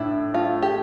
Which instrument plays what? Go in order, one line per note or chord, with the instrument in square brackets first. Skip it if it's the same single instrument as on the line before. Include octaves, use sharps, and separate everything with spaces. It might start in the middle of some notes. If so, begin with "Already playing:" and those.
Already playing: [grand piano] A2 D4 [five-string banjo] E4
[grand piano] A3 [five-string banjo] F4
[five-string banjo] G4